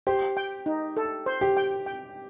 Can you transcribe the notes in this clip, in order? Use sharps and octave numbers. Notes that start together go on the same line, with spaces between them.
G4 C5
G5
D#4
A4
C5
G4
G5
G5